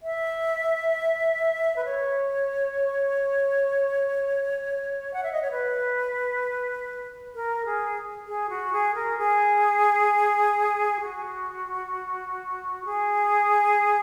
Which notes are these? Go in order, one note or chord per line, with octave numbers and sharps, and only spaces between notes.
E5
B4
C#5
F#5
E5
D#5
C#5
B4
A#4
G#4
G#4
F#4
G#4
A#4
G#4
F#4
G#4